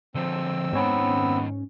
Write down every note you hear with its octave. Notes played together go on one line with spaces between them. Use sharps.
D3 F3 C4 E6
G#2 D#3 B3 C#4 C#5